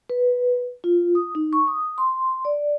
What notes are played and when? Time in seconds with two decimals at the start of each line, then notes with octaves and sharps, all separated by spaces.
0.10 B4
0.84 F4
1.15 D#6
1.35 D#4
1.53 C#6
1.68 D#6
1.98 C6
2.45 D5